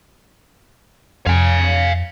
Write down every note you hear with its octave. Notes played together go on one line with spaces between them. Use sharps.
F2 F5 G#5